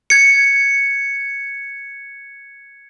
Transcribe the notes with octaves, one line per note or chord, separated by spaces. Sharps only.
G#6 C#7